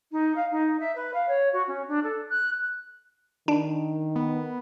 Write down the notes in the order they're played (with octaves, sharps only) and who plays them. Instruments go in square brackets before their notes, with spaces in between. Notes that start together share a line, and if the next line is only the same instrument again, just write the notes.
[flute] D#4
F5
D#4
E5
B4
F5
C#5
F#4
C#4
D4
A4
F#6
[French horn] D#3 [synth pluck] D4
[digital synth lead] B3